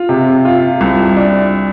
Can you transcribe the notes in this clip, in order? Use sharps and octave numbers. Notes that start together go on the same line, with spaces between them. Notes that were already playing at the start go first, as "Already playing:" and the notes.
Already playing: F4
C3
F4
C2
D4